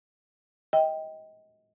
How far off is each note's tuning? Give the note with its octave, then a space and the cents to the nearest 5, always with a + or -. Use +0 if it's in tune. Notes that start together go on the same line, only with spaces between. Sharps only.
D#5 +25 G5 +5